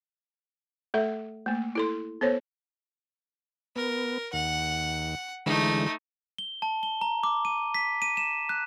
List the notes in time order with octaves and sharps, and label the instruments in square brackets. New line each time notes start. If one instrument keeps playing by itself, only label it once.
[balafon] A3 A4 E5
A3 A#3
E4 A4 C6
B3 A4 C5 C#5
[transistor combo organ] B3 [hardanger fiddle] A#4
[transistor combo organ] D#2 [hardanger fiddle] F#5
[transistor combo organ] D3 E3 G#3 [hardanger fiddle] A3 D#4
[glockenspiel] G7
A5
G7
A#5
D6
D#7
B6
D#7
E7
F#6